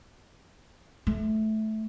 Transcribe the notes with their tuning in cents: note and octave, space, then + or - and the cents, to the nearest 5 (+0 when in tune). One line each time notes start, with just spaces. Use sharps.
A3 -15